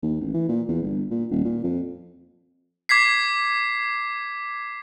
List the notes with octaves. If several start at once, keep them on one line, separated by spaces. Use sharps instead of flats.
D#2
A1
E3
A#2
E2
G1
A#2
D#1
A#2
F2
D6 G#6 B6 C7